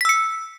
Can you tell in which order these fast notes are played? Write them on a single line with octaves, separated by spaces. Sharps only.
B6 E6 C#7